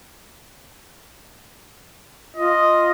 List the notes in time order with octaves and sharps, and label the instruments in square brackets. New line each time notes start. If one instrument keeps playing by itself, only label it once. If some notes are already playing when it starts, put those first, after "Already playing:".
[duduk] F4 [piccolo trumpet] D#5